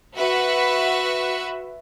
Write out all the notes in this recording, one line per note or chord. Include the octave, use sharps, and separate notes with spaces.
F#4 B4 E5 F#5